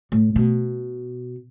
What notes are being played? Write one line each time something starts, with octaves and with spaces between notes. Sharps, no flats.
A2
B2